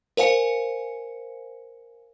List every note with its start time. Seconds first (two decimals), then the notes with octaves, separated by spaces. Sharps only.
0.17 A#4 C5 F5 G#5 C#7